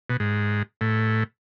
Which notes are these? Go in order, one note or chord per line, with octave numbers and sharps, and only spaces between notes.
B2
G#2
A2